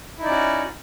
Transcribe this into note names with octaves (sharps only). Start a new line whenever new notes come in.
C#4 D#4 E4 F#4 D5